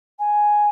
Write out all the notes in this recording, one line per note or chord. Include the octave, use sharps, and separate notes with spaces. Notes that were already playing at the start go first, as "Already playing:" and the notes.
G#5